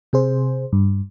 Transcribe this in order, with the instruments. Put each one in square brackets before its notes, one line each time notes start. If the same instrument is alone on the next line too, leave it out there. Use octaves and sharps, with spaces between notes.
[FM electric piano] C3 G#4 C5
G2